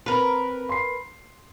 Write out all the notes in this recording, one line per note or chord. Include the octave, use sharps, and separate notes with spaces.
C4 A#4 B4
C6 C7